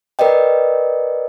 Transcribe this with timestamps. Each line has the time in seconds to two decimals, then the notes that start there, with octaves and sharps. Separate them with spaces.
0.19 A#4 B4 D5 D#5 G5